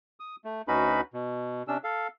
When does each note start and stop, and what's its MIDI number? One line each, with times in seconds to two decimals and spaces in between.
0.20 0.36 87
0.45 0.62 57
0.68 1.01 38
0.68 1.01 61
0.68 1.01 63
0.68 1.01 66
0.68 1.01 71
0.68 1.01 83
1.14 1.63 47
1.68 1.78 48
1.68 1.78 61
1.68 1.78 62
1.68 1.78 88
1.84 2.07 69
1.84 2.07 77